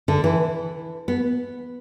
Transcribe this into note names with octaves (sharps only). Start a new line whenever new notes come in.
D3
E3
B3